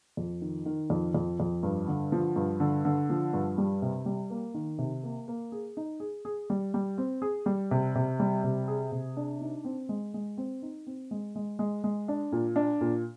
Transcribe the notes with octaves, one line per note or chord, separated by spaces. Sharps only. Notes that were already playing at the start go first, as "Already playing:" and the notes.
F2
D#3
D#3
F2
F2
F2
G2
D3
F3
G2
D3
D3
F3
G2
G3
C3
G3
A#3
D#3
C3
A#3
A#3
G#4
D#4
G#4
G#4
G3
G3
C4
G#4
G3
C3
C3
G3
C3
G#4
C3
D4
D#4
C4
G#3
G#3
C4
D#4
C4
G#3
G#3
G#3
G#3
D4
A#2
D4
A#2